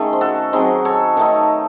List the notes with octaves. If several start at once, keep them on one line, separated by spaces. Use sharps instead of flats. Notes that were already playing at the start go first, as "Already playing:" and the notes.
Already playing: D#3 A3 C#4 D#4 G#4
C5
F#4 A4
F#3 C4 D#4 G#4 C5
A4 C#5
D#3 A3 D#4